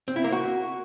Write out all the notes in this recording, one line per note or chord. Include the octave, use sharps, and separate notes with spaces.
C4
E4
A#3
F#4